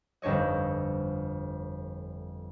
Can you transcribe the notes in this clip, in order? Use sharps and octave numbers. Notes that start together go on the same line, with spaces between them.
G1 F2 D4 C#5 D#5